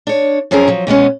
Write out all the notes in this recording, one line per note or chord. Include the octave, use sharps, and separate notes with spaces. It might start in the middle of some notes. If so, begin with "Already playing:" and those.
D4 C#5
F#2 F3 C4 C#4 G#4 A#4
F3 F#3
B2 G#3 B3 C#4